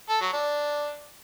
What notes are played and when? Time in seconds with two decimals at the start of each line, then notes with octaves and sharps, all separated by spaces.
0.09 A4
0.21 F#3
0.33 D4